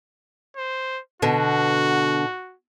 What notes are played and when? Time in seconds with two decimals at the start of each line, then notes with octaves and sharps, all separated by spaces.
0.57 C5
1.22 B2 D3 F#4